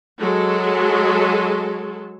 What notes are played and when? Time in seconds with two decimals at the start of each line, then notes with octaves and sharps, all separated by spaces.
0.19 F#3 G#3 A4